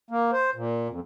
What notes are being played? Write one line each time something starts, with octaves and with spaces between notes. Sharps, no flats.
A#3
C5
A#2
F2